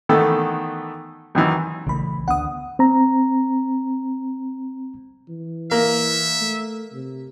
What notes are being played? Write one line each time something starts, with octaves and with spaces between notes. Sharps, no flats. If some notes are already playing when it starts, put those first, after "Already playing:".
D#3 E3 A3 B3 A4
F#2 D#3 E3
A#1 C#3 E3 A3 B5
D2 B3 D4 F#5 D#6
C4 A#5
E3
A#3 E5
A3
C3